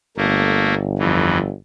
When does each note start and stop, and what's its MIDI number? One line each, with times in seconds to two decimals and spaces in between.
0.17 1.51 31
0.17 0.74 57
0.17 0.74 58
0.98 1.38 41
0.98 1.38 52